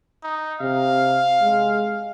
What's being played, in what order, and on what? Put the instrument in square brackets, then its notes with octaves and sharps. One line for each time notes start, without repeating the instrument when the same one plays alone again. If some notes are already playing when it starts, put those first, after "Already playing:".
[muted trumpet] D#4
[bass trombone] C3 [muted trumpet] F5
[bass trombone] G#3